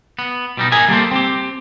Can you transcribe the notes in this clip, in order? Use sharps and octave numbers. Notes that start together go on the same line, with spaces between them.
B3
B2 G3 D#4
A#4 D#5 E5 G#5
G3 A#3 A4 C5
C4 G4